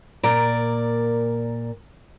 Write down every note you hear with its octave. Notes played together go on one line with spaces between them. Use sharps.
A#2 A#4 D5 A#5